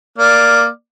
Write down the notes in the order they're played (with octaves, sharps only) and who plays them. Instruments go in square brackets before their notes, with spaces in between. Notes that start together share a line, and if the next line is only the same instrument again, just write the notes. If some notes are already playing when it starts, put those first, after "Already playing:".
[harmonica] A#3 D5 F6